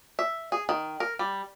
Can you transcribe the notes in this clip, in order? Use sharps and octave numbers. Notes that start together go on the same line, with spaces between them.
E5
G#4
D#3
A#4
G3